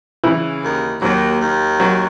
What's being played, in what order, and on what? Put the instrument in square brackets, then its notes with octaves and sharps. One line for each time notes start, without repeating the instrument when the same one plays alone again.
[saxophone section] C#3 [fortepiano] E3
[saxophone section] D#2
[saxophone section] D#2 [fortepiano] F#3
[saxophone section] D#2
[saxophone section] F#2 [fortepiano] F#3